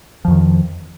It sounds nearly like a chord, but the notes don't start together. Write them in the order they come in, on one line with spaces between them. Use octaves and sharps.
F3 F2 D#3